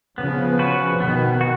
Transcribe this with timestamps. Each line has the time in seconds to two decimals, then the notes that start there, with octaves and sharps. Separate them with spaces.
0.18 C#3 F3 B3
0.59 F#4 B4
1.00 B2 D#3 B3
1.41 F#4